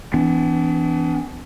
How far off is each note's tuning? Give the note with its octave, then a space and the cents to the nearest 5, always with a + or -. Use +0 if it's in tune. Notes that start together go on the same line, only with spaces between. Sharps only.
E3 +5 B3 +40 D4 -20